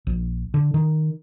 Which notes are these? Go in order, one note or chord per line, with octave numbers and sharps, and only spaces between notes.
A#1
D3
D#3